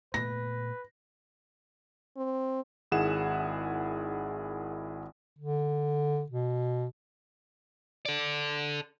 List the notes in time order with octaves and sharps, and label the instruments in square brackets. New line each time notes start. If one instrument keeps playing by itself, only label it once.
[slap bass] A#2 A3 B3 [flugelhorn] B4 [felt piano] A#6
[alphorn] C4
[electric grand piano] G#1 D#3 E4 G#4 F#5 E7
[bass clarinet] D3
B2
[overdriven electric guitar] A4 D5